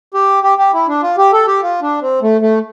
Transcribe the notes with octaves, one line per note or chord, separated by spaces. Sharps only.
G4
G4
G4
E4
D4
F4
G4
A4
G4
F4
D4
C4
A3
A3